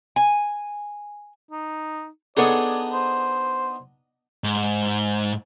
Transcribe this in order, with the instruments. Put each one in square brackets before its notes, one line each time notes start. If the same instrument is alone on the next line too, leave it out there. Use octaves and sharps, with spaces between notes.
[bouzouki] G#5
[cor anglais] D#4
[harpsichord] B3 D4 D#4 [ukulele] G#4 A4 C#5 [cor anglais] D5
[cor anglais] C5
[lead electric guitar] G#2